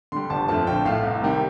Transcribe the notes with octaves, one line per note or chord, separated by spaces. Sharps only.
D3 G3 C6
G1 A5
F2 D3 F3 A3 A5
A#1 G5
A2 A3 F5
C2
C3 D#3 G3